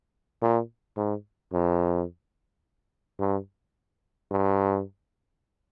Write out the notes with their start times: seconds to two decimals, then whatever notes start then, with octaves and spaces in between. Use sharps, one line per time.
0.42 A#2
0.97 G#2
1.53 F2
3.19 G2
4.31 G2